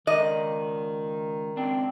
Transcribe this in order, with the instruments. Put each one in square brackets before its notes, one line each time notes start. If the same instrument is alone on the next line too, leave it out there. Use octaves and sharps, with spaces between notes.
[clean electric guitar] C#2 D5 [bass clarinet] D#3 [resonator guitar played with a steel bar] D#5
[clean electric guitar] C#2 G#2 D4 [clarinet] C4